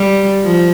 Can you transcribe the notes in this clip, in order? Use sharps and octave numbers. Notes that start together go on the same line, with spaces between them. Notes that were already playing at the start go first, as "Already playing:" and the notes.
Already playing: G3
F3